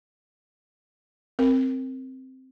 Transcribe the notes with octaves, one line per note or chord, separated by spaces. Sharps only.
C4 A#4